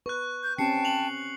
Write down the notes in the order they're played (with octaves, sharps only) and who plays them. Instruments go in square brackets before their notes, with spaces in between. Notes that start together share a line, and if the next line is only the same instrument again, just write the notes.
[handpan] B4 [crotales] C#6 F#6
[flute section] G6
[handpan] C4 C#4 G4 [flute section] G5 A5 [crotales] C7 C#7
[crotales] F7 F#7